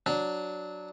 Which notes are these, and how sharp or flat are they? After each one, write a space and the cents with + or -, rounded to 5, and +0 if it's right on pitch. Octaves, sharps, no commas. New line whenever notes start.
F#3 +0 D4 +0